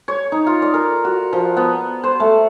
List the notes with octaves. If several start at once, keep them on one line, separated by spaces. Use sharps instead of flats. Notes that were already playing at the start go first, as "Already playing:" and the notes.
C#5
D#4
F4
D5
A#4
F#4
F3
B3
C5
A3